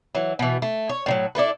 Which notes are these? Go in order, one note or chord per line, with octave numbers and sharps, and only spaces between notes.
E3 F#3
B2 E3
A3
C#5
A2 D3 F#3
D4 E4 A4 B4